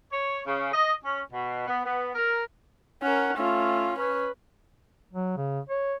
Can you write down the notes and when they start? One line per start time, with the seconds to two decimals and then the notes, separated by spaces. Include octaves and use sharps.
0.12 C#5
0.46 C#3
0.74 D#5
1.04 C#4
1.32 B2
1.67 B3
1.85 B3
2.15 A#4
3.03 C#4 A#4 F#5
3.38 A3 C#4 F4
3.99 C#4 B4
5.13 F#3
5.37 C#3
5.69 C#5